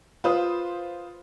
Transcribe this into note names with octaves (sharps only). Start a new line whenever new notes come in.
F4 B4 C5 D#6